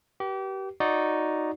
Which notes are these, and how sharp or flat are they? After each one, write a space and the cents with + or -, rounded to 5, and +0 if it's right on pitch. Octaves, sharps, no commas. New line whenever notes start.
G4 -30 B4 -40
D#4 +0 F#4 -15 D5 -10